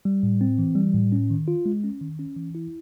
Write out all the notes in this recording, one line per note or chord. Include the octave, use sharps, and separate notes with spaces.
G3
A2
C4
E3
G3
A2
C#4
D#3
F4
G#3
C#4
D#3
C#4
E3
E4